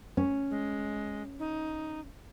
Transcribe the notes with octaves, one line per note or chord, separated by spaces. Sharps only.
C#4
G#3
D#4